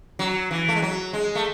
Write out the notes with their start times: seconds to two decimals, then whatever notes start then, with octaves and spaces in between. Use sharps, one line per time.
0.19 F#3
0.51 E3
0.69 A3
0.75 G#3
0.82 F#3
1.13 G#3
1.35 A3